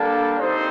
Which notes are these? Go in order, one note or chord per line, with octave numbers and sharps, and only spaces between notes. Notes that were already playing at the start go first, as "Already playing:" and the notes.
Already playing: G3 A#3 D4 A4
C4 D#4 G4 C5